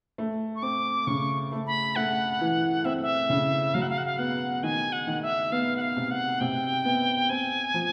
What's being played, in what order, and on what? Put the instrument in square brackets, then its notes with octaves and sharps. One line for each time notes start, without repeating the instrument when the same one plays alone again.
[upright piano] A3
[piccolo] C#6
[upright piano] C4 [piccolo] D6
[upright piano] C#3 [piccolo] C#6
[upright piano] A3
[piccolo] B5
[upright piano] A3 [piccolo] F#5
[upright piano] E3
[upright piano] C4 [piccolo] E5
[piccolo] E5
[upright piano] C#3
[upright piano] F#3 [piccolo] F5
[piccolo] F#5
F5
F#5
F5
[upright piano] B3 [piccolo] F#5
[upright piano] D#3 [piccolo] G#5
[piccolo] F#5
[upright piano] D#3
[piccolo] E5
[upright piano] B3 [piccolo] F5
[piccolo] F#5
F5
[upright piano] C3
[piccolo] F#5
[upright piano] C3 [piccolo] G5
[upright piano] B3
[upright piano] C4 [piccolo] G#5
[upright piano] F3